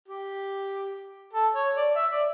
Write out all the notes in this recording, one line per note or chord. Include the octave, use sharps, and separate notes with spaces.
G4
A4
C#5
D5
E5
D5